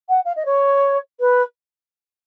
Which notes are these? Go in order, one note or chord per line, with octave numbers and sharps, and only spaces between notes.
F#5
F5
D#5
C#5
B4